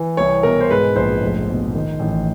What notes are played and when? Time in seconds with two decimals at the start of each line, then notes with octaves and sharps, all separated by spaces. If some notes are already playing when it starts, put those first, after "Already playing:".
Already playing: E3
0.17 C2 C#5
0.43 B2 A#4
0.61 C5
0.70 G#2 B4
0.96 A#1 C5
1.22 F1
1.49 B2
1.75 D#3
2.00 A1